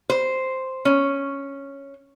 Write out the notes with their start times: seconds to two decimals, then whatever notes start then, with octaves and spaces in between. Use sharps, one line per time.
0.10 C5
0.85 C#4